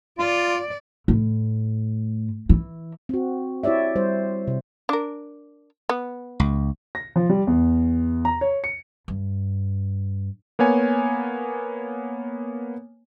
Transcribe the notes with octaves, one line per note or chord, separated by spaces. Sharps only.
F4 D5
A2
E3
C4 F#4
E4 G4 C#5 D5 E5
G3 C5
C3
D4 A#4
B3
C#2
A#6
F3
G3
E2
A#5
C#5
C#7
G2
A#3 B3 C#5 G#5